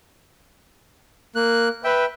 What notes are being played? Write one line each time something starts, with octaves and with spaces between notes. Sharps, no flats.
A#3 F#6
B4 E5 G5